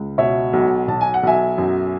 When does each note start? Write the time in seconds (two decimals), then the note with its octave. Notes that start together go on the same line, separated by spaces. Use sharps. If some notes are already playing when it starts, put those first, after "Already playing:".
Already playing: C#2
0.18 B2 C#5 E5
0.53 B1
0.88 B1 A5
1.01 G#5
1.14 F#5
1.23 B1 E5 G#5
1.58 F#2